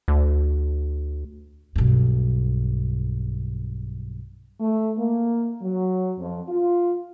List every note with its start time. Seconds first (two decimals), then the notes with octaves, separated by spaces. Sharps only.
0.08 D2
1.76 B1 G2
4.60 A3
4.98 A#3
5.62 F#3
6.19 F2
6.49 F4